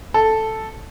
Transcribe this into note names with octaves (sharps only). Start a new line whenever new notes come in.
A4